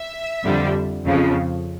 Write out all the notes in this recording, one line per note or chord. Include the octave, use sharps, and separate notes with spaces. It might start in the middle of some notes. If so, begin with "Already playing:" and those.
Already playing: E5
F2 D3 G3
F2 C#3 F3